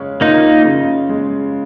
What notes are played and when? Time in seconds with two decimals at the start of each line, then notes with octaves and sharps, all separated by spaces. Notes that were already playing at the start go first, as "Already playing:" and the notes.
Already playing: C#3 G#3 C#4
0.21 A#3 D#4 F4
0.64 C#3
1.09 G#3